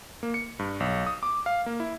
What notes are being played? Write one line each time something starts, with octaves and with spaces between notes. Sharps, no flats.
A#3
C#7
G2
B1
D#6
D6
F5
A#3
E4